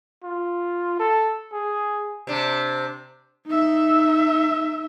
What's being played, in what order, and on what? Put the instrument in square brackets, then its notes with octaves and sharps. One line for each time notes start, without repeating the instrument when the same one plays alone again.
[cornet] F4
A4
G#4
[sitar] C3 D4
[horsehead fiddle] D#4 E5